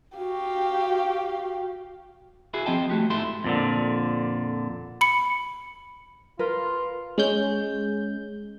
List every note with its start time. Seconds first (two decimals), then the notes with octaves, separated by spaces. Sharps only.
0.18 F#4 G4 F5
2.54 E4 F#4 G#4
2.66 F3 C4 D#5 G5 A5
2.90 A3 F#4 G4
3.10 G#2 A3 E4 E5 C6
3.44 F2 A#2 D3
5.01 B5 C#7
6.39 F4 A#4 B4
7.18 G#3 C#4 G6